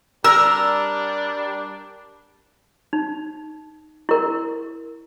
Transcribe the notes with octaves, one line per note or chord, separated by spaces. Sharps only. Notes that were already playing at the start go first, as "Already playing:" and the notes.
G3 D4 A#4 E6
D#4
E4 A#4